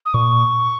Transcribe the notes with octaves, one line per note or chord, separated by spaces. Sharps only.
D#6
A#2 C#6